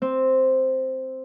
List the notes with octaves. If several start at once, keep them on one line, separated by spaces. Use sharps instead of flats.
C4